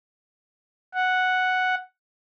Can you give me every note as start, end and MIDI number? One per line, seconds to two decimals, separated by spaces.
0.94 1.75 78